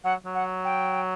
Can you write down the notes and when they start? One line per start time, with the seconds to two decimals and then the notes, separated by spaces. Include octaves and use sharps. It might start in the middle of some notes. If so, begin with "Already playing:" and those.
0.04 F#3 F#5
0.26 F#3
0.35 F#5
0.64 G5